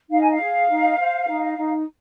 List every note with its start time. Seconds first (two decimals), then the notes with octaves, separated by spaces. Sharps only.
0.10 D#4 F5
0.20 G#5
0.31 F5
0.40 G#4
0.69 D#4
0.98 C5
1.28 D#4
1.57 D#4